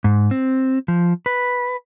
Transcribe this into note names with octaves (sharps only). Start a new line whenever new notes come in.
G#2
C4
F3
B4